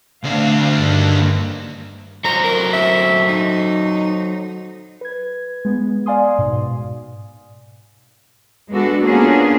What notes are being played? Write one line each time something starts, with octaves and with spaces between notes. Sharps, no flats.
D2 A3 C4 D4 F5
G2 D#3
F#3 A4 C5 A#5
A#4
E5
D#4
B4 G#6
G#3 B3
D5 F5 G#5 C6 D#6
G#2 B2
G#3 B3 D4 F#4 A4
A#3 B3 C#4 D4 F4 G#4